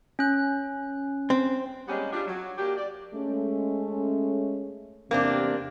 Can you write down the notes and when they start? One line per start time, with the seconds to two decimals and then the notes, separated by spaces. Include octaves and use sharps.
0.19 C#4 F#6
1.30 C4
1.88 G3 G#3 A#3 B3 C#4 G4
2.12 G3 D4 F4
2.27 F#3
2.58 F#3 A#3 D4 G4
2.77 D5
3.15 G#3 A3 C#4
5.11 E2 C3 A#3 C4 D4